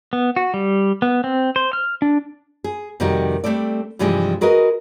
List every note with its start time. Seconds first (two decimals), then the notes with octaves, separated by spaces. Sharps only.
0.13 B3
0.36 F#4
0.54 G3
1.02 B3
1.24 C4
1.56 C5
1.73 F6
2.02 D4
2.64 G#4
3.00 F2 C3 D#3 G3 D#4 F#4
3.44 G3 A3 C4 A4 D5
3.99 G2 C3 E3 F3 G3 G#3
4.41 F#4 G#4 A#4 B4 D#5